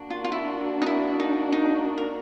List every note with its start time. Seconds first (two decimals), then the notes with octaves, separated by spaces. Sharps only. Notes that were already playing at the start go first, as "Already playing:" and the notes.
Already playing: A#3 D4 F#4
0.10 F4
0.24 F4
0.32 E4
0.82 D#4
0.86 E4
1.20 D#4
1.52 D#4
1.98 A#4